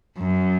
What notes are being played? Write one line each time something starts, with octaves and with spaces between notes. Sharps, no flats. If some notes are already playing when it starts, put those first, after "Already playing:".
F#2